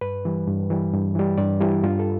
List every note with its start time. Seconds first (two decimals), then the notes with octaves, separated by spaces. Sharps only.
0.01 G2 B4
0.25 E3 G3
0.47 G2
0.70 E3 G3
0.93 G2
1.15 E3 G3
1.38 G2 D5
1.61 E3 G3 E4
1.83 G2 F4
1.99 A4